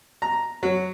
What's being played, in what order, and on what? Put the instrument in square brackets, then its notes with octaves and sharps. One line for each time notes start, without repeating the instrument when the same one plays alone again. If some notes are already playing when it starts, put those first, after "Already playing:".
[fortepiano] A#5
F#3